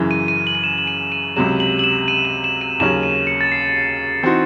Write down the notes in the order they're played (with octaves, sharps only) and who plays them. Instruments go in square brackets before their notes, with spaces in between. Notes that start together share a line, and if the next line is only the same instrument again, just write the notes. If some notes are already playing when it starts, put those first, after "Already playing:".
Already playing: [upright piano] F#2 C#3 E3
[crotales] D#7
D#7
F#7
D#7
E7
E7
D#7
D#7
[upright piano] C#2 C3 F#3 [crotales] E7
[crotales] F#7
F#7
E7
D#7
E7
E7
D#7
[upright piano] D#2 C#3 F#3 C#4 [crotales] E7
[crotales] D#7
C#7
A6
C7
[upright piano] E3 C4 D#4 F#4 C5